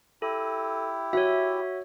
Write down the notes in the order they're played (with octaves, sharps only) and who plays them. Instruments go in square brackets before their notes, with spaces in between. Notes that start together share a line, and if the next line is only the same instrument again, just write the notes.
[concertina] E4 G4 [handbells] A4
[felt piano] F#4 [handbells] C#5 E5